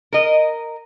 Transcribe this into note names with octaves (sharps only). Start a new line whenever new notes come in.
A#4 D#5